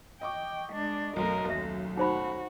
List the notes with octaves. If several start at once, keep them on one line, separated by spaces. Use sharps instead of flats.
D#5 G5 C#6 D6
G#3 D4
B1 F#2 A3 A#4 D#5
D#2 E5
D#4 F#4 C5 B5